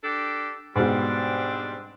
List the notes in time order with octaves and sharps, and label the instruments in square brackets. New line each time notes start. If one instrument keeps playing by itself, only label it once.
[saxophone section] D4 G4 A4
[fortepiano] G#2 B2 [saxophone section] G3 C4 D4